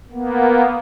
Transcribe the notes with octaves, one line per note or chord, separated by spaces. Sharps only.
A#3 B3